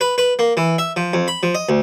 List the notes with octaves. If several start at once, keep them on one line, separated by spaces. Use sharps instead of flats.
B4
B4
A#3
E3
E5
F3
F2
B5
F3
D#5
D2